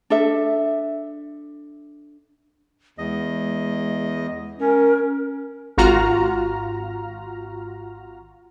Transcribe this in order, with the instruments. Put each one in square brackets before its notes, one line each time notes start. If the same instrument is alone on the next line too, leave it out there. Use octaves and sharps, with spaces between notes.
[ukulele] D4 A4 E5
[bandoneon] E2 D#5 [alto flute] G#3
[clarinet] C#4 [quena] A#4
[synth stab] G#1 F4 F#4 A#5 F6